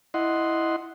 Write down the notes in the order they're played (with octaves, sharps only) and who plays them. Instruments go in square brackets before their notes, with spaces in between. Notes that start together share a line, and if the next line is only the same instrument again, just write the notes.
[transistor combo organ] E4 D#5 F#5 C6